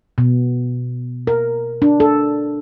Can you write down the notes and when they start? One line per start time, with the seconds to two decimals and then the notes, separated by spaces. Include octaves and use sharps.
0.18 B2
1.27 A#4
1.82 D4
2.00 A4